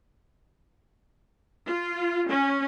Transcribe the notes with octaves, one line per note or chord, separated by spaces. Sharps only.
F4
C#4